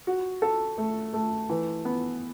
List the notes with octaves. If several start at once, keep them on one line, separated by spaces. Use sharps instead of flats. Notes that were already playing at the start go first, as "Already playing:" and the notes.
F#4
A4
A3
A3
E3
B3